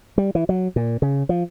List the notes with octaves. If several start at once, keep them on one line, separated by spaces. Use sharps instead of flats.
G3
E3
F#3
A#2
C#3
F3